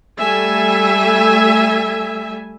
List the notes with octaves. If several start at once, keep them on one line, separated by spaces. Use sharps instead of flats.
G3 A3 E5 G#5